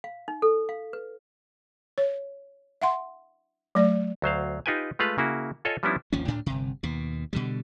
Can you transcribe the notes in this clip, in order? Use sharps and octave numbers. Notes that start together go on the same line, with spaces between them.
F5
D#4
A4
F5
B4
C#5
E5 F#5 C6
F#3 A3 D5
D2 F#3 C5 F5
D#4 F4 G4 B4 G5 G#5
G#3 A3 F4 B4 F5
C#3 A#3 E4 F#4
F4 A4 C#5 D#5 G#5
F3 G3 B3 C#4 D4 E4
G#1 D#2 F3 C#4
D2 A2 D4
G1 C3
D#2 B2
B2 D3 G3